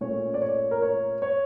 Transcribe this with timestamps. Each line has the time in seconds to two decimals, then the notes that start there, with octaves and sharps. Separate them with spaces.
0.01 A#2 A3 C#4 C#5
0.34 D5
0.42 C#5
0.71 A#4
0.82 C#5
1.22 C#5